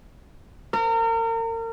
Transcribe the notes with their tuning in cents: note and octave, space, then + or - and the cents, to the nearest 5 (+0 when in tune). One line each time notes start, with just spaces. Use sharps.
A#4 -35